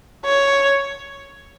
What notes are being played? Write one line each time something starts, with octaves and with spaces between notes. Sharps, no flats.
C#5